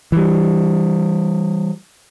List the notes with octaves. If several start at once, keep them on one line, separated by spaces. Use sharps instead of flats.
E3 G3